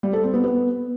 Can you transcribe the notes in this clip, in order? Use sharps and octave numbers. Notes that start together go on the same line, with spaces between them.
G3
A4
C4
B3
B3